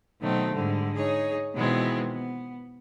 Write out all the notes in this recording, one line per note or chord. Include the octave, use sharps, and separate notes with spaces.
B2 D#3 F#3 A3 C4
G#2 D3 G3
D#4 G#4 C#5
B2 D#3 E3 G#3 B3 C4
B3